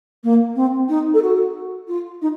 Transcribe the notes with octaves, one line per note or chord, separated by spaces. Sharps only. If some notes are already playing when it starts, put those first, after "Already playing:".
A#3
C4
D#4
A4
F#4
F4
D#4